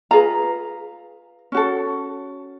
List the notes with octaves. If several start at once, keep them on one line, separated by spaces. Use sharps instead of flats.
F4 G#4 B4 A#5
C#4 F#4 A4